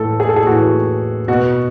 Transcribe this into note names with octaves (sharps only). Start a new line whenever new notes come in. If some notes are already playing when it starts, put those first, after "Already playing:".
Already playing: A2 E3 A4
G#4
A4
G#4
A2 E3 F#4
B2 F#4